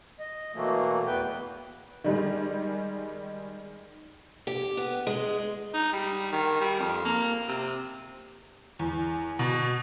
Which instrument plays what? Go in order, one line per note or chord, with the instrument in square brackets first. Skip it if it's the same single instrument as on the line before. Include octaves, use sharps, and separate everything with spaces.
[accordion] D#5
B2 E3 F#3 A3 A#3
E2 B3 B4 G5 G6
[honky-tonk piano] D#3 G3 G#3
[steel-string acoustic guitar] G4
B3
G#3
[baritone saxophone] D#4
G3
D#3
G3
F2
A#3
C3
[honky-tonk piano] E2
B2